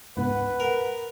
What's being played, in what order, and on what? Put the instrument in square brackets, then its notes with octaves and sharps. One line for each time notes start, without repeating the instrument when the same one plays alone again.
[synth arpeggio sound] C#2 G#2 B3 [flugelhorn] B4 [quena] F#5
[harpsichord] A#4